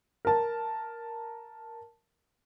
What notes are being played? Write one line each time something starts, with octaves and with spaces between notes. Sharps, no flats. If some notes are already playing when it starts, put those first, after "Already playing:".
A#4 A5